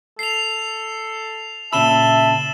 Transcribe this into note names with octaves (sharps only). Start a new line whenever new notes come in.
A4 C7 F7
A#2 C#3 E5 A5 B5 E6 E7 G7